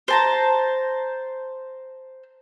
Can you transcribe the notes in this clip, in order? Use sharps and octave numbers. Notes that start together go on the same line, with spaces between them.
C5 A5 A#5